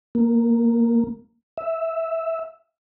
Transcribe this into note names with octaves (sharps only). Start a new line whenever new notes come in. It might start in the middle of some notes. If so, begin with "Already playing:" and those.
A#3
E5